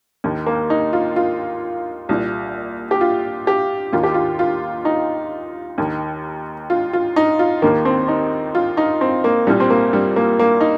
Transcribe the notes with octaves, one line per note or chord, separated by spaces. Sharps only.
D#2 D#3
A#3
D#4
F4
F4
C2 A#2
G4
F4
G4
D#2 D#3 F4
G4
F4
F4
D#4
D#2 D#3
F4
F4
D#4
F4
D#2 D#3 A#3
C4
D#4
F4
D#4
C4
A#3
C2 A#2 G3
C4
A#3
G3
A#3
A#3
D#4